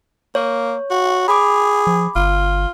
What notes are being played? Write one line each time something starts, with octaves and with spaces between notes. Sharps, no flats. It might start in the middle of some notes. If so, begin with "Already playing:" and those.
A#3 C#5
F#4
G#4 B5 D6
F3
G1 F4